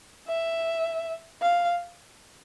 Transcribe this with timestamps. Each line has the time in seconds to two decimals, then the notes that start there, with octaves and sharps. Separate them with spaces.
0.28 E5
1.42 F5